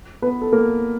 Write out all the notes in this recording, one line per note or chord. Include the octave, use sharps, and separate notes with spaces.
B3 B4
A4
A#3 A#4